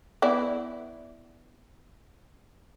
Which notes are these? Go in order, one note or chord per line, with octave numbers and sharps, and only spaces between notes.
B3 E4 D5